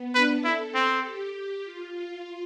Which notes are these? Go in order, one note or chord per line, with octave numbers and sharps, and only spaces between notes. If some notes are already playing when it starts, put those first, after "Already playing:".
Already playing: B3
D4 B4
E4 A4
C4
G4
F4
F4